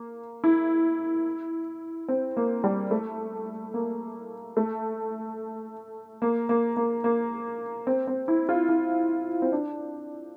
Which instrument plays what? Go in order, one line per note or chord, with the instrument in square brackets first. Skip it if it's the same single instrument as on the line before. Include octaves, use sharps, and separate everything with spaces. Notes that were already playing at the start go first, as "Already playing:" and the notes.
Already playing: [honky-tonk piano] A#3
E4
C4
A#3
G3
A3
A#3
A3
A#3
A#3
A#3
A#3
C4
C4
E4
F4
E4
C4
D4